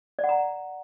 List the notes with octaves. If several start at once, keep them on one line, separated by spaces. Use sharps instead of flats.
D5
F#5
A#5